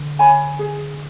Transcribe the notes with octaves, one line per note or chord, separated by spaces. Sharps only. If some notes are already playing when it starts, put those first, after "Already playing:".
Already playing: D3
C#5 G#5 B5
G#4